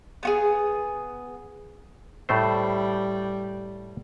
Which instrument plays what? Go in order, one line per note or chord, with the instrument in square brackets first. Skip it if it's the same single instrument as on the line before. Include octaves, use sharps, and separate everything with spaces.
[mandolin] B3 F#4 G#4
[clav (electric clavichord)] A2 A3 C5 [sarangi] G3